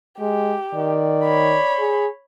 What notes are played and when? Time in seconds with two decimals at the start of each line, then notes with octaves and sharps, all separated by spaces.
0.20 G#3 G4
0.74 D#3 D5
1.25 C#5 B5
1.79 G#4